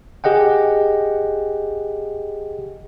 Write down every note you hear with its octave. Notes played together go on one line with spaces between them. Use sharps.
G4 G#4 D#5 F#5 G5